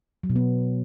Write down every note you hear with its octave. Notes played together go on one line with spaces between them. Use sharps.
F#3
B2
B3